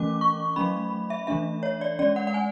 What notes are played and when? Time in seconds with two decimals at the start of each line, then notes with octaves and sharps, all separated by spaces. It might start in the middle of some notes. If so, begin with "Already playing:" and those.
Already playing: E3 A3 C#4 D6
0.21 C#6
0.56 F#3 A3 C#4 B5
1.10 E5
1.27 E3 A3 D4 E5
1.63 C#5
1.81 D5
1.99 G#3 C#4 D5
2.16 F#5
2.27 F#5
2.34 G#5